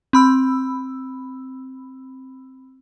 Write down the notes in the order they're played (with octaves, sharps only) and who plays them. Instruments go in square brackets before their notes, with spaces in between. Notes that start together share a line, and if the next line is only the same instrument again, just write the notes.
[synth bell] C4 B5 E6